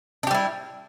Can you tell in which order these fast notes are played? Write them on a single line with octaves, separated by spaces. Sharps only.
D4 G4 G3 E4